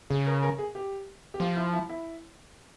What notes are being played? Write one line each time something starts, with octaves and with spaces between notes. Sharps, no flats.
C#3 G#4
A#4
A#4
G#4
G4
G4
F3 F4
E4
E4
E4